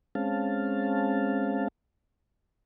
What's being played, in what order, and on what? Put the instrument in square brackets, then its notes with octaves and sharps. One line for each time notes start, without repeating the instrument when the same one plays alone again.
[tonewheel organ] G#3 C4 C#4 F5 A5